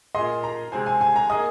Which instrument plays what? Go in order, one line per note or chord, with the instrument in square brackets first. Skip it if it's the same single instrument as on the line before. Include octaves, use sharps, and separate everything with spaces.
[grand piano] A#2 A#3 G#4 D#5 [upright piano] C6
[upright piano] A#5
[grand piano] C3 G#3 C4 G#4 C5 [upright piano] G#5
[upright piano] G#5
G#5
A#5
[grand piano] A#3 G#4 D#5 [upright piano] D#6